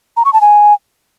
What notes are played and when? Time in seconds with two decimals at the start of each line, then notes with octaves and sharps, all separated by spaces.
0.17 A#5
0.25 C#6
0.33 A5
0.41 G#5